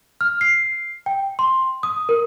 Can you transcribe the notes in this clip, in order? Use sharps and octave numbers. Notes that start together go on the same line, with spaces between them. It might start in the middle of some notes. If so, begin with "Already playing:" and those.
F6
C7
G5
C6
D#6
A#4